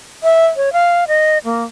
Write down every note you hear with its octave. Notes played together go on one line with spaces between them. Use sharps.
E5
C#5
F5
D#5
A#3